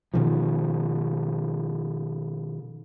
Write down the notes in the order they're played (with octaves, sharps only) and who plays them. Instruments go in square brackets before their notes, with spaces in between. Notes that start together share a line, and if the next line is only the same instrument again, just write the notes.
[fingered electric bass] B2 D#3 F3